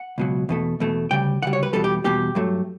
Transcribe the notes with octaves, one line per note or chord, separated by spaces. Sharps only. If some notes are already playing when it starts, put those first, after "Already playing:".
Already playing: F#5
C#2 B2 F#3
E2 B2 A3
E2 B2 A3
D2 C#3 G3 G5
D2 C#3 G3 F#5
C#5
B4
E2 B2 G3 A4
G4
E2 B2 G3 G4
G2 F#3 A3